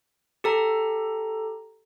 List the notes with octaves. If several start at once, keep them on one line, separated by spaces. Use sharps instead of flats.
G4 A4 A#5